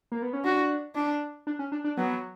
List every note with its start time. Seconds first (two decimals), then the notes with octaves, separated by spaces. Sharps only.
0.12 A#3
0.22 B3
0.33 C#4
0.44 D4 F#4
0.95 D4
1.47 D4
1.59 C#4
1.72 D4
1.84 D4
1.97 F#3 B3